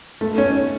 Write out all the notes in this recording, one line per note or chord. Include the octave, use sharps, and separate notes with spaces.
A3
C#4